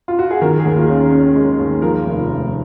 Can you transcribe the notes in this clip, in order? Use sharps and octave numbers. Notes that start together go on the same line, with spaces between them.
F4
F#4
G#4
D#3 A#4
G#4
D#2
F4
C#4
C#4
G#3
D#2
F3 A#4
F1
F1